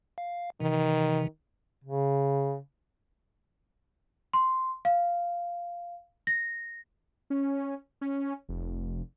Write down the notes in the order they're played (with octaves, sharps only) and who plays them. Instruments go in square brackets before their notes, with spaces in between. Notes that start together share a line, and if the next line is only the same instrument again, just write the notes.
[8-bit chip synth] F5
[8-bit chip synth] C3 E3 [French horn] D#3
[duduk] C#3
[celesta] C6
F5
A#6
[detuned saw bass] C#4
C#4
F1